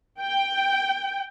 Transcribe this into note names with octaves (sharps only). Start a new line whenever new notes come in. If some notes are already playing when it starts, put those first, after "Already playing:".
G5